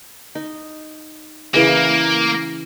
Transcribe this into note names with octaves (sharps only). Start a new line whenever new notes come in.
D#4
C#3 E3 A#3 G#4